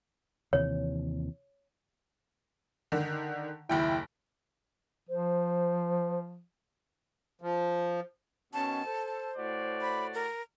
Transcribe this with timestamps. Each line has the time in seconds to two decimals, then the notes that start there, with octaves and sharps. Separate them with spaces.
0.53 D#2 C3 E3 C#5
2.92 D3 D#3
3.70 F#1 D#2 E4 G5
5.09 F3 C5
7.42 F3
8.54 B2 D#3 C#4 C#5 A5
8.85 A4 C5
9.36 A2 F#4 D5
9.81 B5
10.14 A#4